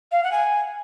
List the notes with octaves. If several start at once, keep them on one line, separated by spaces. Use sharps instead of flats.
F5
F#5
G#5